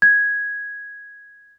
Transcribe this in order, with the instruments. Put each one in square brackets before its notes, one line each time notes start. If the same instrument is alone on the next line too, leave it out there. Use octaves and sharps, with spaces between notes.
[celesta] G#6